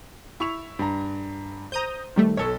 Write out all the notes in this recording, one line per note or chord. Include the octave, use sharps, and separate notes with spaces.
E4 C#6 F7
G2 A#5
C5 A#5 D#6 G6
D#3 G3 A3
B1 A4 C#5 E6